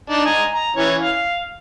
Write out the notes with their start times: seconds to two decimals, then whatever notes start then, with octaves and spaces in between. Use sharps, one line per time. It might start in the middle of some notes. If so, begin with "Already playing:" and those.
0.10 D4 D#4
0.25 D#5 G#5 A#5
0.54 A#5
0.76 E3 C#4 C#5
1.01 F5